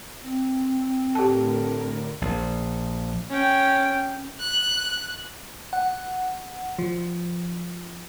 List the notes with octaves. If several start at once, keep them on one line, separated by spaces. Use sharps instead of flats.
C4
A2 D3 G4 A4 A#4 A5
A#1
C#4 G5
F#6
F#5
F3